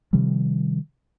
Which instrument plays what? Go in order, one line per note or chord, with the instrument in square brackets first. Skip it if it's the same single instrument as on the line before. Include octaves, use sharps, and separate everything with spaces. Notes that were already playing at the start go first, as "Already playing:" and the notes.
[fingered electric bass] C3 D#3 F3 G3